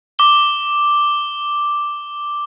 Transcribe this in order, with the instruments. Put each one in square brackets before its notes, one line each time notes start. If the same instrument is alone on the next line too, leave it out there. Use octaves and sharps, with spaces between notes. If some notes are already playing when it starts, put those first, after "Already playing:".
[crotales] D6 G7